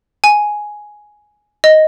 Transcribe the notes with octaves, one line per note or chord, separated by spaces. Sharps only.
G#5
D#5